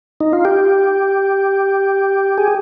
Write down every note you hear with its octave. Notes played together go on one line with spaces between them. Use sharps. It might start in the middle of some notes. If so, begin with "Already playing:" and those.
D#4
F4
G4
G#4